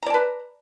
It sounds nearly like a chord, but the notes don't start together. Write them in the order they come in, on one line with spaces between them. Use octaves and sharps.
A#5 D5 A5 B4